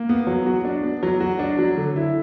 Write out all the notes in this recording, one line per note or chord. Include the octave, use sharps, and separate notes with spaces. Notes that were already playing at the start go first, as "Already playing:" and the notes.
Already playing: A#3
B3
F#3
F#4
D4
B3
F#3
F#4
D4
F#3
D3
E4